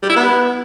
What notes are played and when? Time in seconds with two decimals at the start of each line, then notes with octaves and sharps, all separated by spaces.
0.03 G3
0.09 E4
0.16 B3